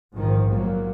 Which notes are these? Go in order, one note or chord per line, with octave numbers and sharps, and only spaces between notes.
A#1 G#2 D#3 F3
A#2 F#3 A#3